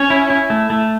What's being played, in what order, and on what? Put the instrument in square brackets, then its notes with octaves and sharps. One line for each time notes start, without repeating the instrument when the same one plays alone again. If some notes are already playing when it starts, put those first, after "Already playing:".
Already playing: [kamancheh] C#4 [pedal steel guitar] C#5
[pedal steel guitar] E4
E4
A3
A3